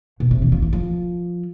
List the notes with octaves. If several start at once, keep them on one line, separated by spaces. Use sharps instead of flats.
B2
C3
E3
F3
E3
F3